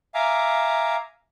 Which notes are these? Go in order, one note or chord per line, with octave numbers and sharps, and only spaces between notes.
E5 F5 G#5 A#5 D6